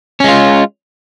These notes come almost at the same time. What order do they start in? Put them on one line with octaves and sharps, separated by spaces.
C#4 G#3 F4